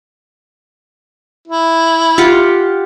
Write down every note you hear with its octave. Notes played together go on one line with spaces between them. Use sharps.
E4
F4 G4 F#5